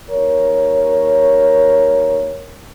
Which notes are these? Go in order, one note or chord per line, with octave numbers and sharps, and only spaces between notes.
D#2 A#4 C#5